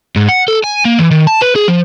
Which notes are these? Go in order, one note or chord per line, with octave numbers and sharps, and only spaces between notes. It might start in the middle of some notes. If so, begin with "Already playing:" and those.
G#2
F#5
A4
G#5
A#3
E3
D#3
A5
B4
G#4
F3